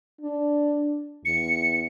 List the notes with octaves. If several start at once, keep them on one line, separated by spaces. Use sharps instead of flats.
D4
E2 C#7